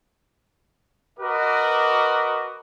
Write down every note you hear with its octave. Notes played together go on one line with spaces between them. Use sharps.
F#4 A#4 B4 D#5 D6